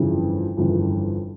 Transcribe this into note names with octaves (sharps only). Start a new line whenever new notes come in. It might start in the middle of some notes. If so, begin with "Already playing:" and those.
Already playing: G1 F2 C#3 E3
G1 F2 C#3 E3